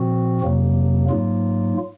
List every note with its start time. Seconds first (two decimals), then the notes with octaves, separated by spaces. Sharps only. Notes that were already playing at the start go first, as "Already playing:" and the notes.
Already playing: A#2 F3 C4 F#4
0.41 F2 C3 F#3 A#3
1.09 G#2 F#3 A#3 F4